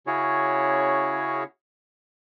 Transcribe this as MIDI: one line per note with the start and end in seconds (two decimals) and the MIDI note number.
0.07 1.44 49
0.07 1.44 61
0.07 1.44 64
0.07 1.44 66
0.07 1.44 68
0.07 1.44 73